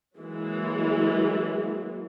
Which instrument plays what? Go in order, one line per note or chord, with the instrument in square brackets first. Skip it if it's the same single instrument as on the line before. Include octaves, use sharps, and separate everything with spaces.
[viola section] E3 F#3 G#3 A#3